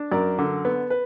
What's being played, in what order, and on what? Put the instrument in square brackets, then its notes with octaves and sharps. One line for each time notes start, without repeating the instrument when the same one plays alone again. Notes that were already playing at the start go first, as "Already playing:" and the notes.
Already playing: [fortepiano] D4
[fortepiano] F#2 [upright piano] A#4 D5
[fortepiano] D3
B3
[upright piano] B4